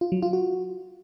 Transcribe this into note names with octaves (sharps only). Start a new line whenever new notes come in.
F4
F#3
F4
F#4